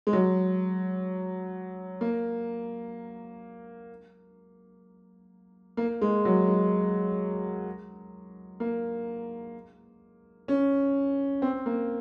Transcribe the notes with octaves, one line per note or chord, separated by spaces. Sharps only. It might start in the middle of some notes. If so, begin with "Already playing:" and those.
G#3
F#3
A#3
A#3
G#3
F#3
G#3
A#3
C#4
C4
A#3